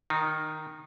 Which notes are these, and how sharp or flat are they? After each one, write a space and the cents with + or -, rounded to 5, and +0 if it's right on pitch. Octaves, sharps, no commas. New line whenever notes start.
D#3 +0 D#4 -25